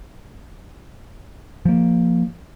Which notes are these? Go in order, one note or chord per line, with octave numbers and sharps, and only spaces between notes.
F3 A#3